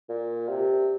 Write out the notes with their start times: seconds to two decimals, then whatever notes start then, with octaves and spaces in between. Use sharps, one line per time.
0.09 A#2
0.48 C3